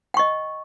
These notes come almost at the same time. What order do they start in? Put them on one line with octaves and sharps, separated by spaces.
G5 C#6 D#5